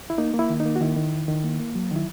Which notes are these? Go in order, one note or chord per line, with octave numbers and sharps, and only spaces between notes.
E4
A#3 D#4
A#3
E4
D#3
D#4
A#3
F#4
D#3 E4
D#3
E2
D#3
A#3
A#3
F#3
D#3 E4